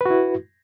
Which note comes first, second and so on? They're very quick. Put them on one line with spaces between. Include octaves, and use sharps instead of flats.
B4 F#4 E4